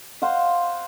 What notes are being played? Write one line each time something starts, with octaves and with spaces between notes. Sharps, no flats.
C5 F5 F#5